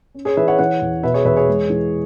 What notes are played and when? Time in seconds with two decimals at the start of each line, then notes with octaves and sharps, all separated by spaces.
0.15 C#4
0.25 G#4 C#5
0.37 E3 B4 E5
0.48 C#5 F#5
0.59 E3 C#5 F#5
0.81 E2
1.03 B2 B4 E5
1.14 G#4 C#5
1.25 E2 B4 E5
1.36 G#4 C#5
1.48 G#3
1.70 E3